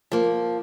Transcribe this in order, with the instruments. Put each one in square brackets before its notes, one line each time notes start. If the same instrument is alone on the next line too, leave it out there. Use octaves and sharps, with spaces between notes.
[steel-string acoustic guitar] F3 A#3